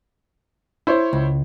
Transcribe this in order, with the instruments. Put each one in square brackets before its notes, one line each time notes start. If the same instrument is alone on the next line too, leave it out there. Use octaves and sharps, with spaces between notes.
[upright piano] E4 C5 C#5
[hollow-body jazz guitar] C#2